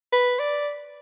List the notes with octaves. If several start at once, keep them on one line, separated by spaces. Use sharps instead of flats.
B4
D5